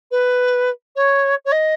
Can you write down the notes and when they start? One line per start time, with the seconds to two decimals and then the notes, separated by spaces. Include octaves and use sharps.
0.11 B4
0.96 C#5
1.45 C#5
1.52 D#5